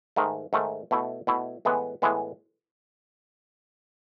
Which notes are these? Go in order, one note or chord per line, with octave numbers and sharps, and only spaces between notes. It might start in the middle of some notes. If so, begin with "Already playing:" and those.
G#2 D#3 A3
G#2 D#3 A3
B2 A3 E4
B2 A3 E4
A2 E3 G#3 B3
A2 E3 G#3 B3